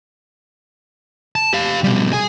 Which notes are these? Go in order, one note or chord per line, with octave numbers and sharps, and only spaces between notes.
A5
G4 F5
B2 G3
G#4 G#5